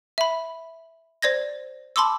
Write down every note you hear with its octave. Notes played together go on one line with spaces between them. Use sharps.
E5 B5
C5 D5 G#6 A#6
A5 B5 C6 D6 E6